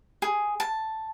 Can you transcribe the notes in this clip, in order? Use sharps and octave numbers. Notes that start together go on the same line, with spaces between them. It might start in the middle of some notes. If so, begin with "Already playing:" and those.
G#4
A5